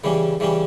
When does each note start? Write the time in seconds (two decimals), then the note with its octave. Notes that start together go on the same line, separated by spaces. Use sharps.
0.04 C#3 E3 G3 C#4
0.40 C#3 E3 G3 C#4